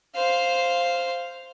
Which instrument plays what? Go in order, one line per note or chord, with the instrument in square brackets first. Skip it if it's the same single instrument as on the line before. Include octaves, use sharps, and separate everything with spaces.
[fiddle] C5 F5